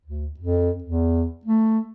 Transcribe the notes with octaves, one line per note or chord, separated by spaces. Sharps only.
D2
F2
E2
A3